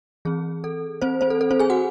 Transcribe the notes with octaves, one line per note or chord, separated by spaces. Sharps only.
E3 C4 G#4
A4
C4 C5
C4 C5
A4
A4
C4 C5
G#4 G#5
F#4 F#5